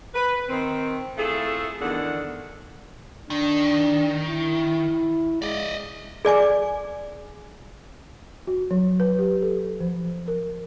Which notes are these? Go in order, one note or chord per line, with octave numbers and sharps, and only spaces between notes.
B4
D#3 C4
A3 E4 F4 G#4 A4
E2 D3 D#3 D4 A4 F#5
D#3 D4
E4
G#3 D5 D#5
G#4 D5 G#5 D6
F#4
F#3
B4
G4
A4
F3
A#4